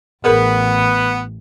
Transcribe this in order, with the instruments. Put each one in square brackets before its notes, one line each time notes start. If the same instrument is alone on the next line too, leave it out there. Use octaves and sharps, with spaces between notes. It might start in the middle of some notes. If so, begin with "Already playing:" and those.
[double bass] A1 [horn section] B3 [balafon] G#4 A#4 B5